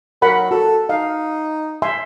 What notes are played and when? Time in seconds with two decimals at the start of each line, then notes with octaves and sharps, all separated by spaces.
0.22 F#3 A#4 F#5 B5
0.51 F#4 A4
0.89 D#4 F5
1.82 E5 G#5 C6